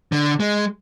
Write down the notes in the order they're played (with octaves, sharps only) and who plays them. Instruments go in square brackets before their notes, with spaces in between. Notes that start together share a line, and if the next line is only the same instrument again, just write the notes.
[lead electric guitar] D3
G#3